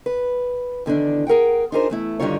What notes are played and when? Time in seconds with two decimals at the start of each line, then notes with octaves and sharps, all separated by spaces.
0.06 B4
0.86 E2 D3 D#3 D4
1.27 G#4 A#4 F#5 G5
1.72 D4 D#4 F4 G#4 A#4 C5
1.90 E2 A3 E4
2.20 G2 D3 D#3 G3 F4 C#5